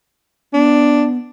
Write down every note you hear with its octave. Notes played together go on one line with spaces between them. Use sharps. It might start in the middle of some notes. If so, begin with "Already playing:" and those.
B3 D4